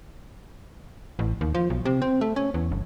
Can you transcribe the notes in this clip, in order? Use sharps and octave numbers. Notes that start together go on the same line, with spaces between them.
A1
D#2
F3
B1
C3
C4
A3
C#4
E2
G1